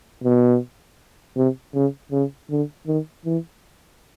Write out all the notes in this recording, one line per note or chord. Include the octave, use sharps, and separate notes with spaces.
B2
C3
C#3
C#3
D3
D#3
E3